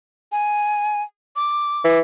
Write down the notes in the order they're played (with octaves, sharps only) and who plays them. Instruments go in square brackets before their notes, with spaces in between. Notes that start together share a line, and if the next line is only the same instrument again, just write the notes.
[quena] G#5
D6
[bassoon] E3